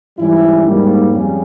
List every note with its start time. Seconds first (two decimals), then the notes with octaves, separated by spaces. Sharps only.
0.18 G#2 E3 G3 C#4 E4
0.64 G#2 G3 A#3
1.11 F2 C#3 G3 C#4